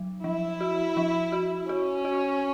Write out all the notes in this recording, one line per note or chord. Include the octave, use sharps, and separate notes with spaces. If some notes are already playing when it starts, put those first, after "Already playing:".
Already playing: F#3
F3 E4
F#4
F3
F#4
C#4 F#4
F#4